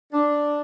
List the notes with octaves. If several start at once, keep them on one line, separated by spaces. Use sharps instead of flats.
D4